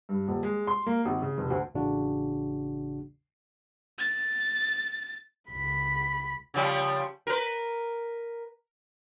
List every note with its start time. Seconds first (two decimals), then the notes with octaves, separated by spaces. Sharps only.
0.09 G2
0.28 D#1
0.43 G#3
0.67 C6
0.86 A#3
1.05 G#1
1.22 C#3
1.38 F1
1.50 D2
1.75 A1 A2 C#3 D4 F#4
3.98 A6
5.51 C#2 B5 B6
6.54 C#3 F3 G3
7.27 A#4 B4